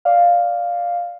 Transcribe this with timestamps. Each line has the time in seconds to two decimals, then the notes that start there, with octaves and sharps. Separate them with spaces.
0.05 D5 F5